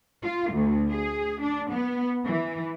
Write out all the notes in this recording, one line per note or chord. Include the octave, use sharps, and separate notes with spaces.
F4
D2
G#4
D4
B3
E3